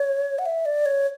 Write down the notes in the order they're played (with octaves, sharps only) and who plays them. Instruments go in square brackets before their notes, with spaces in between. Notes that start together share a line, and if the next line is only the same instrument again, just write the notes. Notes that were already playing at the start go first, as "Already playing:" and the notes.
Already playing: [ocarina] C#5
F#5
E5
D5
C#5